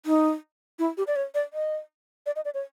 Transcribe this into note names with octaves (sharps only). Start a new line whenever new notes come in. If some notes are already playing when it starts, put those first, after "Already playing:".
D#4
E4
G4
D5
C#5
D5
D#5
D5
D#5
D5
C#5